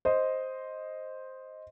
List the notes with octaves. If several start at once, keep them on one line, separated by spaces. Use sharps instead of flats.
C5 D#5